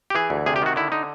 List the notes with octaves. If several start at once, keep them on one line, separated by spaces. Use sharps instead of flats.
G4
E3 G#4
D2
C3 G#4
G4
D#3 F#4
D3 E4
D3 D#4